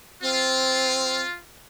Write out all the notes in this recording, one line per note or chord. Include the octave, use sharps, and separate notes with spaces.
C4 F4